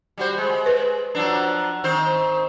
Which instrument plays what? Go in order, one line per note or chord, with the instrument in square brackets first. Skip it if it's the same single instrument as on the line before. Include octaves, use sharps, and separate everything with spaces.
[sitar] G3 F#4 C5
G#3
[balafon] B4
[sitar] F3 F#3 D4
D#3 C4 C5